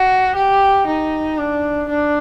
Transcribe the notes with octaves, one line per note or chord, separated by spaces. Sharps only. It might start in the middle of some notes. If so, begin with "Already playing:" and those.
Already playing: F#4
G4
D#4
D4
D4